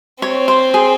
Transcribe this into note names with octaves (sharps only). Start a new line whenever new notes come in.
C4 C#5
C5
G#4